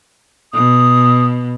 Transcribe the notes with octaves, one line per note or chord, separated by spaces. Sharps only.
B2 D#6